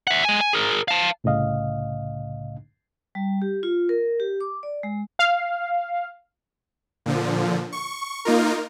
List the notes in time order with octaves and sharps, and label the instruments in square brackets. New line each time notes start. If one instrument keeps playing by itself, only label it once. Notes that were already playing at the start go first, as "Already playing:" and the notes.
[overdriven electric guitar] E5 F#5
G#3 G#5
G#5
G#4 A#4
F5 A5
[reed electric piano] C2 A2 C#3 D#5 F5
[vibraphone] G3
G4
F4
A#4
G4
D6
D5
G#3
[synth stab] F5
[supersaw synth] A#2 D3 F3
C#6
A#3 D#4 F4 A#4